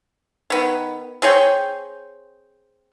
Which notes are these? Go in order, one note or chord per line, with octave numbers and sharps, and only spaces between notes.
D#3 B3
C4 G#4 C#5 G5